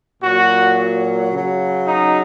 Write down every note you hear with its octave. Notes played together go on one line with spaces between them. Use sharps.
A#2 F#3 F#4
C#3 F#3
D#4